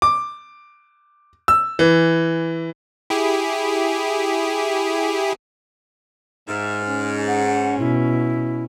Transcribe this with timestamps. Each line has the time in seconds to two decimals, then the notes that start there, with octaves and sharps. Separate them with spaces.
0.02 D6
1.48 E6
1.79 E3
3.10 E4 G4 G#4
6.48 G#2 E5 F6
6.86 C#4
7.27 F#5
7.79 B2 E4